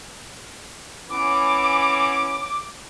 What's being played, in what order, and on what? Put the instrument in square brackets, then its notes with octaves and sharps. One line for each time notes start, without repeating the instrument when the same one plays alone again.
[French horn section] E3 B3 C#4 [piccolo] D6